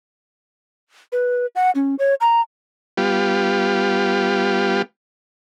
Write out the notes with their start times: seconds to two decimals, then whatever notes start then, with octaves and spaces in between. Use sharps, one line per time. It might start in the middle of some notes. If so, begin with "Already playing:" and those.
1.12 B4
1.56 F#5
1.75 C#4
1.99 C#5
2.21 A#5
2.97 G3 B3 F4 G4